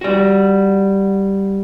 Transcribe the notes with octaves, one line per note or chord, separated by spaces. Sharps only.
G3 F#4